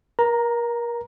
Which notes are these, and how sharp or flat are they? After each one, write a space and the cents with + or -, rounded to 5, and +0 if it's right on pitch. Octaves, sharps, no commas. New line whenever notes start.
A#4 +30 A#5 +0